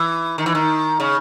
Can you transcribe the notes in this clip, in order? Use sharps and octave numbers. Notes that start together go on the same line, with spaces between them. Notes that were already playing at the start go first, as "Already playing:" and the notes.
Already playing: E3
D#3
E3
D#3
C#3